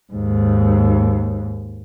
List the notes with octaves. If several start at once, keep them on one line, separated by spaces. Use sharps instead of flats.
D#2 G#2